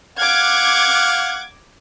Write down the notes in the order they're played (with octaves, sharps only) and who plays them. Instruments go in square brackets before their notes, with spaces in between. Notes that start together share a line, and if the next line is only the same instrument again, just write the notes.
[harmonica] F5 F#5 [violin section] D6 G#6